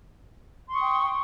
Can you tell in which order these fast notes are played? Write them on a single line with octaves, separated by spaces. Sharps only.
C6 C#6 D#6 G5